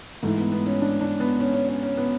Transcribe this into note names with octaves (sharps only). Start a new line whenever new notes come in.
G#2 E3 A3
B3
B3
C#4
D4
D4
B3
C#4
C#4
C#4
C#4
B3